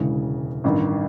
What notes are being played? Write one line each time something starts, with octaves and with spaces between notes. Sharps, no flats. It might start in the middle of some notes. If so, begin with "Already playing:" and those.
Already playing: E1 D2 C#3 E3 G#3
A1 G2 D#3